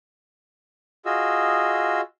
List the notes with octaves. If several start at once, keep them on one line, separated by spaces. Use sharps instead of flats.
F4 F#4 G#4 D#5 E6